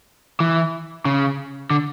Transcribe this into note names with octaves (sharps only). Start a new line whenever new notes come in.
E3
C#3
D3